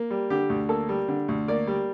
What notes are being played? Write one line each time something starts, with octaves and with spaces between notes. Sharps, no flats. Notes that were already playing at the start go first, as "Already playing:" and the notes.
Already playing: A#3
G3
D3 G4
D2
A#3 A4
G3
D3
D2
A#3 D5
G3